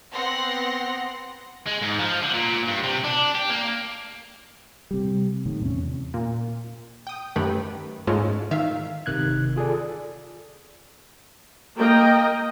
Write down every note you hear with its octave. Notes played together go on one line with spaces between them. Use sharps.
B3 C4 F#5 C6 A#6
G#3
G#2
F3
D3
A#2
G2
C3
D4
G4
A#3
C3 G3
A2 D#3
E2 C3 C#4
A#2
G5 D#6
F#2 D#3 A3 G4 B4
G#2 G#3 A3 C#4 F4
D#3 E5 F5
G1 C3 D#3 F#6 G#6
F4 G#4 A4 D5
A#3 A#4 D#5 G5